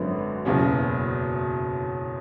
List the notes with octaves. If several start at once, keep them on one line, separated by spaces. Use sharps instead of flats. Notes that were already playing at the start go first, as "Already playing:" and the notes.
Already playing: G#1 F#2 D3 F#3 B3
F#1 E2 B2 F#3 C#4